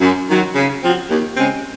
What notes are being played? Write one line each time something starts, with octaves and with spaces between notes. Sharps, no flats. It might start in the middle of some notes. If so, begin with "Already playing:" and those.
F#2
D#3 F#3
C#3
F3 C4 F#4
D#2
C#3 G#3 C4